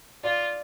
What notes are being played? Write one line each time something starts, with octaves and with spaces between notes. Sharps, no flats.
F4 D5